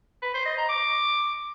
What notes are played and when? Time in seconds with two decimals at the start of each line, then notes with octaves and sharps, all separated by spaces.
0.22 B4
0.34 C5
0.46 D#5
0.57 A#5
0.69 D6